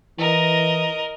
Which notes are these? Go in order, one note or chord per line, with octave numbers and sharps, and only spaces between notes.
E3 A#4 D#5